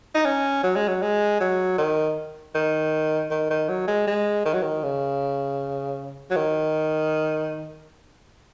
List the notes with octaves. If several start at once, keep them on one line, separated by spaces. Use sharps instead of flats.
D#4
C#4
F#3
G#3
F#3
G#3
F#3
D#3
D#3
D#3
D#3
F#3
G#3
G#3
D#3
F#3
D#3
C#3
F#3
D#3